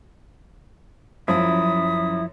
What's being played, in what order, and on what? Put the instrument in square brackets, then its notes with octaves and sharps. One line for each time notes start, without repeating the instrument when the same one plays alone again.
[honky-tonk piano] F#2 [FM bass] F3 [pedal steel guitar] E4 [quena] D#6